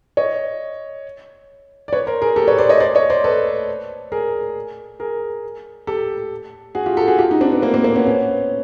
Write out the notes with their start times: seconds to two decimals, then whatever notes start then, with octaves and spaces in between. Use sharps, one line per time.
0.17 C#5 D#5
1.88 D5
1.93 B4 C#5
2.07 A#4 C5
2.21 G#4 A#4
2.36 G4 A4
2.48 B4 C#5
2.58 C5 D5
2.69 C#5 D#5
2.80 C5 D5
2.95 C#5 D#5
3.10 C5 D5
3.24 A4 B4
4.12 G#4 A#4
5.00 G#4 A#4
5.87 G4 A4
6.75 F#4 G#4
6.86 F4 G4
6.97 G4 A4
7.08 F#4 G#4
7.18 F4 G4
7.31 D#4
7.41 C4 D4
7.52 B3
7.62 A#3 C4
7.74 A#3 C4
7.84 A#3 C4
7.96 B3 C#4
8.06 B3 C#4